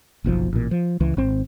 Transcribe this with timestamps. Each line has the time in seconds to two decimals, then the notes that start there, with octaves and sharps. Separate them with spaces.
0.24 F#1 B1 A2 F3
0.53 A1 A#2
0.71 F3
1.00 C#2 E3
1.17 G#1 C4